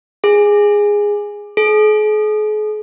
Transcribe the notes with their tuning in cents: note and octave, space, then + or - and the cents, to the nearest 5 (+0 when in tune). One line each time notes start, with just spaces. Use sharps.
G#4 -10
G#4 +45